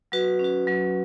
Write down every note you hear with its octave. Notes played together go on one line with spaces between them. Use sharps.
F#3 F#4 B4
C#4
F#4
F#3